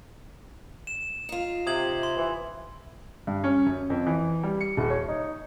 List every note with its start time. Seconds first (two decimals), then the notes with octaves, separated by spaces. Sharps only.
0.87 E7
1.29 D#4 F4
1.67 C3 D#6 G#6 F#7
2.03 C6
2.17 E3
3.27 G2
3.44 C#4
3.66 F#2
3.90 F2
4.07 E3
4.44 G3
4.61 C#7
4.77 D#1
4.90 C#5
5.09 D#4